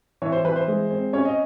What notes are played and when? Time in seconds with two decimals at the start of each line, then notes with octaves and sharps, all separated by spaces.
0.22 E3 C#5
0.32 C5
0.44 E3 B4
0.56 C5
0.68 G#3
0.90 C4
1.13 C#4 C#5
1.25 D#5